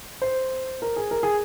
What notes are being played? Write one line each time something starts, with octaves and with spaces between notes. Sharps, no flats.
C5
A#4
G#4
A#4
G#4